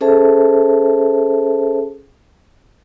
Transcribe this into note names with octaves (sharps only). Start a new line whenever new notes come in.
C#4 G#4 A4 C5 E5 A5